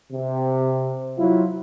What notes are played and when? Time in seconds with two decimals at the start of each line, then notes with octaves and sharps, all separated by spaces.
0.12 C3
1.18 F#3 E4 F4